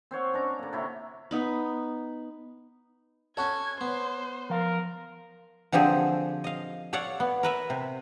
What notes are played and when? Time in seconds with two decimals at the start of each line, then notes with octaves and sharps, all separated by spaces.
0.11 C4 C5 C#5 F#5
0.33 C#4 D4 A#5
0.59 D3 A#3
0.73 C3 E4 C#5
1.31 B3 D#4 B5
3.37 C#4 F#4 A4 C#5 G#6
3.81 B3 C5
4.50 F3 A#4 F5
5.72 D3 F3 C4 G4 G#4 C5
6.44 D#5 F5
6.93 A4 C#5 D5 F5 F#5
7.20 B3
7.43 A#4 B4 E5
7.70 C3